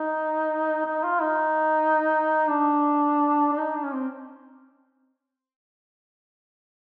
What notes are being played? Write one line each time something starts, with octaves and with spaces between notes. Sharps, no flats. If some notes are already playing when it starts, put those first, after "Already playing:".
Already playing: D#4
D#4
F4
D#4
D4
D4
D#4
D4
C#4
C4